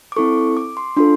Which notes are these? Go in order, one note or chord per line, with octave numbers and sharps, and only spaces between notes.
D6
C4 E4 A4 C#6
D6
C6
D4 F4 A4 C6